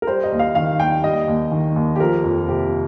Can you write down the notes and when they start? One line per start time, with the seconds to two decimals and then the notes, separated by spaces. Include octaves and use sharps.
0.02 A#4
0.07 G3 C5
0.24 D#5
0.32 D#2
0.39 F5
0.55 D#3 F5
0.80 D#2 G5
1.04 G3 D#5
1.28 D#2
1.52 D#3
1.76 D#2
1.96 G4
2.00 F3 A#4
2.24 F2
2.48 C3 G4